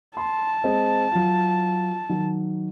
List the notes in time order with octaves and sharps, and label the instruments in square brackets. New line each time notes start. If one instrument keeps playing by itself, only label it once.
[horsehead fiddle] A5 [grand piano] C6
[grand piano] G#3 C4 D#5
F#3 F4
D#3 F#3